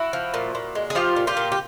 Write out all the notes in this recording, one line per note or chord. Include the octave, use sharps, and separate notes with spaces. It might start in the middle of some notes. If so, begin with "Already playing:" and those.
Already playing: E4 F#4
F3
A#2
A#2
G#3
G#4
F3 F4 G4
A#2
F4 G4
A#2
G4